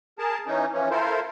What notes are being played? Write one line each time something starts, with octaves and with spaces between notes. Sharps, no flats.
G#4 A#4 A5
E3 C#4 D#4
E3 F3 C#4
E4 F4 A4 A#4 C5